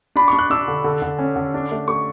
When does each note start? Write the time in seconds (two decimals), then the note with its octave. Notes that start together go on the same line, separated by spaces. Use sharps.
0.16 D4 B5
0.28 D4 C#6
0.39 F#6
0.50 D4 E6
0.68 D3
0.84 D3
1.02 D3
1.19 C#4
1.36 D3
1.54 D4
1.71 A3
1.88 A3 C#6